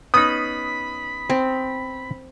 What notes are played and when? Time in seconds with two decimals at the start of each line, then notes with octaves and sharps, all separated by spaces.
0.14 B3 C#4 D#4 B5 D#6
1.30 C4